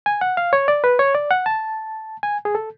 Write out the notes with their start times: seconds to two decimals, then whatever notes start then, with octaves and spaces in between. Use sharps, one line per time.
0.06 G#5
0.21 F#5
0.37 F5
0.53 C#5
0.68 D5
0.84 B4
0.99 C#5
1.15 D5
1.31 F#5
1.46 A5
2.23 G#5
2.45 G#4
2.55 A4